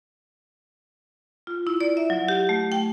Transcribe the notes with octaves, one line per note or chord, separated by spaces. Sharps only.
F4
E4
D5
E5
F#3
G4
A3
G5